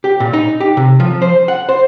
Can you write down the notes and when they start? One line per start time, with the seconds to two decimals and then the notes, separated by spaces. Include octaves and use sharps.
0.04 G4
0.20 A#2
0.33 D#4
0.60 G4
0.77 C3
1.00 F3
1.22 C5
1.48 F#5
1.69 C5